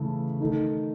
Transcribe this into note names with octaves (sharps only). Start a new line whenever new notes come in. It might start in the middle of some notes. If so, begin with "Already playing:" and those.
Already playing: C#3 E3 A3 E4
D#3 A3 D#4 A4